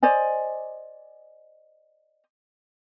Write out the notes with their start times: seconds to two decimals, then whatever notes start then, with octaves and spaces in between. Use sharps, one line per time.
0.03 C5 D5 D#5 G#5